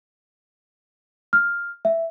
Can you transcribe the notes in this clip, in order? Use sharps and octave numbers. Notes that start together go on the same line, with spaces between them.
F6
E5